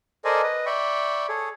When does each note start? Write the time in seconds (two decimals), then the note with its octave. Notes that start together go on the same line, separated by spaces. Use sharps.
0.25 A4 A#4 C5 D5 D#5 G#5
0.43 B4 D#5
0.66 D5 E5 G5 B5 C#6
1.29 G#4 A4 C#5